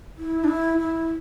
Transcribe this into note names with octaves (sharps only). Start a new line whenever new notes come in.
E4
D4
E4
E4